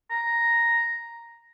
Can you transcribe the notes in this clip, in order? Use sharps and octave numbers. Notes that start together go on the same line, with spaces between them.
A#5